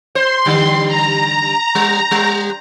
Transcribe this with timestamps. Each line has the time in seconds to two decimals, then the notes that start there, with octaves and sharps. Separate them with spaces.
0.15 C5 C6
0.45 D3 G3
0.88 A#5
1.75 G3
2.11 G3